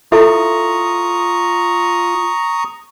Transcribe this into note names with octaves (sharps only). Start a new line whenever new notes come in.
E4 F4 A4 E5 A#5 C#6 D#6